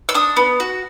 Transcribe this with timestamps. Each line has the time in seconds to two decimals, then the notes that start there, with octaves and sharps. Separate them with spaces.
0.09 E6
0.14 D4 D#6
0.37 B3
0.60 F#4